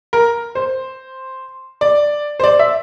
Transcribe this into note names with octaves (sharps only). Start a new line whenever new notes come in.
A#4
C5
D5
C5
D5
E5